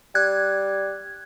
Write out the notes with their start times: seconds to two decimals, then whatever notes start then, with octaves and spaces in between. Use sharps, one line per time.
0.15 G3 F#6 G#6